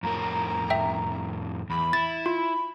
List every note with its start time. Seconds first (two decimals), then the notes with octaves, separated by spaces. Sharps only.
0.03 F2 A2 A#4 A#5
0.70 E5 G5
1.70 E2 B5
1.93 E4 A6
2.26 F4 B5